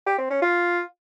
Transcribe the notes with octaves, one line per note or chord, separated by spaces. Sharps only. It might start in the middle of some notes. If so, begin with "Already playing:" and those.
G4
C4
C#4
F4